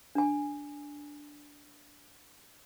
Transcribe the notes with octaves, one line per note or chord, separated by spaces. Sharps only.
D4 G#5